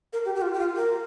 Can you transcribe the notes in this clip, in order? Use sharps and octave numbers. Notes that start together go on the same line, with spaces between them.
A#4
G4
G4
F4
G4
F4
A#4